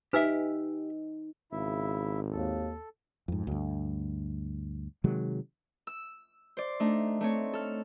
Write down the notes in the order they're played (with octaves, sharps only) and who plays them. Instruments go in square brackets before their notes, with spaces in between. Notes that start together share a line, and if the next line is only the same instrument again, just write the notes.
[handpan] D#4 [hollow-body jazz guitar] G4 E5 [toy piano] B4 G#5 E6
[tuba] G#1 [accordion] C#3 E4 E5
[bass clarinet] D#2 [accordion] A4
[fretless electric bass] F2 G#2
D2 G2
C3 D#3 F#3 G#3
[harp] E6
C5 D5
A3 D4 D#4
A3 C4 C#5
A4 F6